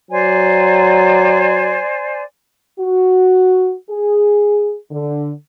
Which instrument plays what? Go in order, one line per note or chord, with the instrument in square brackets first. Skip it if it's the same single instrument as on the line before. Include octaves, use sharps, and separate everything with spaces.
[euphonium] F#3 [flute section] C5 D5 G#5
[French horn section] F#4
G#4
D3